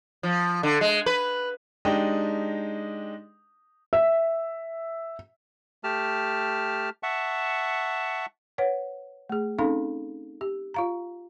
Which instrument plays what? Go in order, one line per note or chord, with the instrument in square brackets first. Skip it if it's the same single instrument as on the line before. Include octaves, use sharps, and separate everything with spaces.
[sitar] F3
D3
G#3
B4
[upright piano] G#3 D4 D#4 G4 D#5 G5
[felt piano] E5
[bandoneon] A3 G4 A5 F6
E5 F#5 A5 C#6
[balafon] B4 C#5 F#5
A3 G#4
C4 C#4 D#4 A4 F5 B5
G4
F4 F5 A#5